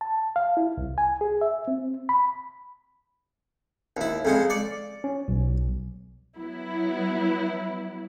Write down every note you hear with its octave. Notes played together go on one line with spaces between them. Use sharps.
A5
F5
E4
C2
G#5
G#4
E5
C4
B5
D#2 E4
F2 C#3 G#3
D5 C#6
C#4
B1
F#3 B3 E4